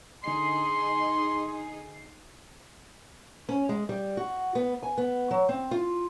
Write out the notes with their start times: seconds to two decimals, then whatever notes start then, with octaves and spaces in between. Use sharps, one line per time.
0.24 D3 D#4 G#4 C6 C7
3.49 C#4
3.69 G#3
3.89 G3
4.17 F#4
4.55 B3
4.83 G#5
4.98 B3
5.31 F#3
5.49 C4
5.71 F4